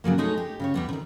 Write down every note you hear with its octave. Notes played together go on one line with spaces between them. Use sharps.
A#2 C#3 F#3 A#3
G#3 A3 D#4 G#4 C#5
G4
C#3 G4 C#5
E2 G3 B3
C3 D#3